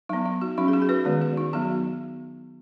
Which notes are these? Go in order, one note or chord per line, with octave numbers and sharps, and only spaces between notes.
F#3 B3 D#4
D#4
F#4
F#3 C#4 D#4
G#4
F#4
G#4
F#4 B4
D#3 G#3 B3
F#4
D#4
F#3 B3 F#4